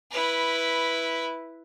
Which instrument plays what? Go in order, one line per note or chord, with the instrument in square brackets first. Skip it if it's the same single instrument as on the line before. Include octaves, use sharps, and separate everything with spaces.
[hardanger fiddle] E4 B4